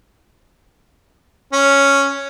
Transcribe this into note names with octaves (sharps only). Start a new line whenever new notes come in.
C#4